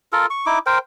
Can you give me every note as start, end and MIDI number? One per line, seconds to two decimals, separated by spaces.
0.12 0.26 65
0.12 0.26 69
0.12 0.26 70
0.30 0.45 85
0.46 0.59 63
0.46 0.59 64
0.46 0.59 86
0.66 0.78 70
0.66 0.78 72
0.66 0.78 79